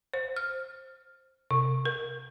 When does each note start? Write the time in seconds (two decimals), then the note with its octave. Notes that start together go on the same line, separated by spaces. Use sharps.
0.14 C5
0.36 F6
1.51 C3
1.85 A#4